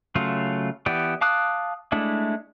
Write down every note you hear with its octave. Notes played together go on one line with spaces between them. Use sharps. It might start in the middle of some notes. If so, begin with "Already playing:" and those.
C#3 F#3 A3 F4
E3 B3 G4 D5
F5 A5 D6 D#6 F#6
G#3 A3 D4 E4